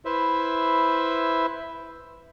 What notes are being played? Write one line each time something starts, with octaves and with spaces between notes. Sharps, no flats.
E4 B4 C5 E5